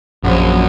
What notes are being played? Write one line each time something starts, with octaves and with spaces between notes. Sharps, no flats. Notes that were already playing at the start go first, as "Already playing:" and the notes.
A#1 F#2